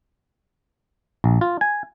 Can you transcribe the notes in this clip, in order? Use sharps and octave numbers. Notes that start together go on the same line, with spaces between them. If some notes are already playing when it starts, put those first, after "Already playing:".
A#1
F4
G#5